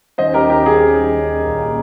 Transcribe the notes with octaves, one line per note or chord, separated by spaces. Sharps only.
D#2 D#3 G3 C#4 C5 D#5
G4 A#4
G4
G#4
C2 A#2 G3 A#3 C#4